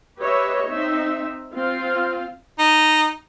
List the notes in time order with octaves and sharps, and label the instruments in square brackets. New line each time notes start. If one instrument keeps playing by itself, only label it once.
[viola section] G4 B4 C#5 D#5 E5
C4 D#4 E5
C4 F4 F5
[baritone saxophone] D#4